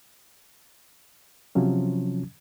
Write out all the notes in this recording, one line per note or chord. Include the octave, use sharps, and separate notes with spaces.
C3 F3 F#3 C#4